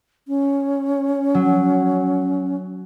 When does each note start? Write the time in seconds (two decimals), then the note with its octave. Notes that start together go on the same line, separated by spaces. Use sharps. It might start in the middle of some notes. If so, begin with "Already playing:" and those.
0.28 C#4
1.34 F#3